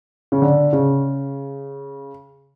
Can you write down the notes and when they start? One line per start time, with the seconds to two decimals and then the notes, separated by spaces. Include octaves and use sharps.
0.32 C#3
0.42 D3
0.73 C#3